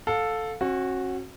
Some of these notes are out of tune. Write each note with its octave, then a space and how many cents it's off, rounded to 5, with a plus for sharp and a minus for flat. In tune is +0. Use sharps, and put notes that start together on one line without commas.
A4 +0 F5 +25
C#4 -45 F#4 -5